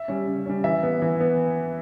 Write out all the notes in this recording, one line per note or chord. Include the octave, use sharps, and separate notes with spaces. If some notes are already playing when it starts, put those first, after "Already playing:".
Already playing: E5
G3 C#4
C#3
G3 C#4
E3 E5
B3
E3
B3